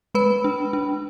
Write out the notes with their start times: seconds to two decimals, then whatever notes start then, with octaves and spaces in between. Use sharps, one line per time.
0.15 G#3 B4 B5
0.44 D4
0.73 D4